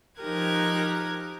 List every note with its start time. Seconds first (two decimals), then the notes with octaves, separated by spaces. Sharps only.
0.21 F3 D#4 G4 A#4 F#6 G#6